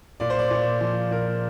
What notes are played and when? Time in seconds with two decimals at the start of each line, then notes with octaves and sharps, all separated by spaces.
0.20 A#2 D5
0.30 C5
0.39 D5
0.51 A#2
0.81 F3
1.11 A#2 A#4